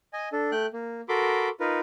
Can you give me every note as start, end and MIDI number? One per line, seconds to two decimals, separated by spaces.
0.13 0.29 75
0.13 0.29 80
0.33 0.51 62
0.33 0.51 69
0.52 0.66 57
0.52 0.66 79
0.52 0.66 90
0.73 1.01 58
1.09 1.49 66
1.09 1.49 69
1.09 1.49 70
1.09 1.49 83
1.09 1.49 84
1.09 1.49 86
1.60 1.80 63
1.60 1.80 65
1.60 1.80 70
1.60 1.80 71